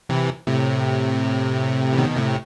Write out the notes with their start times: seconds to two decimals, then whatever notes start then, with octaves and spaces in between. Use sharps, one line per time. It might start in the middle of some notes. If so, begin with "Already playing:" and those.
0.09 C3 E3
0.47 A2 C3
1.93 E3
1.98 B2 D#3
2.17 A2 C3